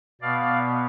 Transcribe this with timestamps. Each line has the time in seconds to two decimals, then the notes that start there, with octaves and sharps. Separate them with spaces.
0.21 B2 B3 D5 F5